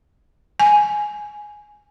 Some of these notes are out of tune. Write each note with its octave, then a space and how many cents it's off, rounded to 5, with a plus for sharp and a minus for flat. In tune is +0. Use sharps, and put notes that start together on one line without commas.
G#5 +10